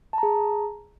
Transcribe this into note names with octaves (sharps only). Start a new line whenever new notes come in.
G#4 A5 A#5